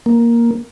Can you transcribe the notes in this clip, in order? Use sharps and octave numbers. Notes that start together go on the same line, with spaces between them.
A#3